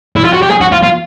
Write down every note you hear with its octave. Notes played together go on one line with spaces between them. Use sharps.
E4
F4
F#4
G4
G#4
F#4
F4
F4